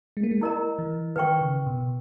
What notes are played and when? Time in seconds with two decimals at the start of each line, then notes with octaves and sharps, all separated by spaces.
0.17 G#3
0.23 A#3
0.31 G#3
0.41 E4 A#4 D#5 A#5
0.79 E3
1.16 D#3 B4 G5 C#6
1.41 C#3
1.66 B2